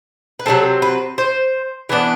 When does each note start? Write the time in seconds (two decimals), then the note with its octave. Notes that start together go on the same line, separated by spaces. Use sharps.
0.39 B4
0.46 C3 F#3 C4 A4
0.82 B4
1.18 C5
1.89 E3 B3 D4